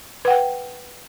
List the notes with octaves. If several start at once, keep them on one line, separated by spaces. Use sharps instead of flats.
B4 F#5 G5